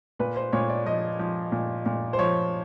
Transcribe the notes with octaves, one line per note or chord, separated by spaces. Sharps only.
A#2 B4
C5
A#2 C#5
D5
F3 D#5
F3
A#2
A#2
C5
F3 C#5